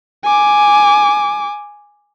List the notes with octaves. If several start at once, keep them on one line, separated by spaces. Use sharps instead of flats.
G#5 D6